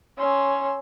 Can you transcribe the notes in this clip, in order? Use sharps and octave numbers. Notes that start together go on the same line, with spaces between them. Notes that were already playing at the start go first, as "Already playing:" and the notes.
C#4 C6 E6